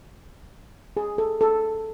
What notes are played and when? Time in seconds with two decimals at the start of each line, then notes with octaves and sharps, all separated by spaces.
0.97 G#4
1.18 A4
1.41 A4